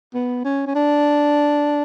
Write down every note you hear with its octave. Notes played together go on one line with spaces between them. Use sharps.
B3
C#4
C#4
D4